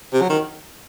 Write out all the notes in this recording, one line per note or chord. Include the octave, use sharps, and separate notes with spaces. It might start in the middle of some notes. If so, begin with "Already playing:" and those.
C3
F#3
D#3